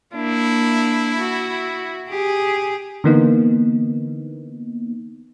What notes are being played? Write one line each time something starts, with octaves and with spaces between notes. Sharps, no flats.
A#3 D4 E4
F#4
G4 G#4
D3 E3 A#3 B3 D#4